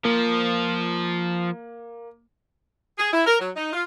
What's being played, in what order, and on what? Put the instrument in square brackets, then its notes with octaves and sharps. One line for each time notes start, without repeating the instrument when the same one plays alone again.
[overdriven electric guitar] F3 [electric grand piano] A#3
[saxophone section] G#4
E4
A#4
F#3
D#4
F4